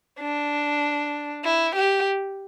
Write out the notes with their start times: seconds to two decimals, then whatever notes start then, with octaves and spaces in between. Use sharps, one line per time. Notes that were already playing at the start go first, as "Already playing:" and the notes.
0.20 D4
1.44 E4
1.75 G4